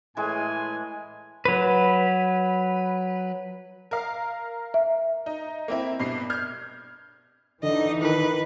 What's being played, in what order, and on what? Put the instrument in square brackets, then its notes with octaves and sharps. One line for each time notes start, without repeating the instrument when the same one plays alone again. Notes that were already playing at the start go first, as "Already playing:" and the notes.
[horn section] A2 G#5 [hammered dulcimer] E3 G#3
[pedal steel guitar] F#3 B4
[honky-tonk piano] A#4 F5
[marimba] E5
[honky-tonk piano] D#4
A#3 C4 E4
G2 B2 C7
F6 G6 G#6
[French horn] D3 [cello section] E3 D#4 [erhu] D#5
[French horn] D#3 [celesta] E4 A#4 [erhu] B4